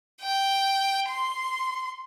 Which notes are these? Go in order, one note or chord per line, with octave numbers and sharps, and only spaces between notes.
G5
C6